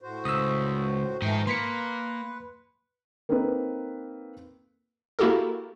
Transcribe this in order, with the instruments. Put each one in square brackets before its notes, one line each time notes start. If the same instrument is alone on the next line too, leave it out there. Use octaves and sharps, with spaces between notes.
[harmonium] A2 F#4 C5
[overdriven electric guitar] C#2 [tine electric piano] D#6 E6
[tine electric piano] G#2 [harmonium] E3 F3 A3 [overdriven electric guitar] D#4 G5
[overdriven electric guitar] A#3 [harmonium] B4 [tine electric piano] C6 B6 C#7
[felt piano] A#3 C4 D#4 A4 B4
[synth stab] A#3 E4 F#4 G4 A4 A#4